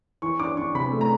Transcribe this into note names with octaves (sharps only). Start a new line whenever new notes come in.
E3 C#6
D4 D6
D4 C#6
C3 B5
A3
A#5